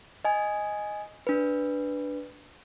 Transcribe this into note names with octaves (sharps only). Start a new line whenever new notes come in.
D#5 G#5
D4 B4